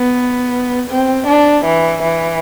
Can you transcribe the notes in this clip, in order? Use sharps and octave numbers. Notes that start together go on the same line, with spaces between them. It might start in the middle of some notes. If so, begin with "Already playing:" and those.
Already playing: B3
C4
D4
E3
E3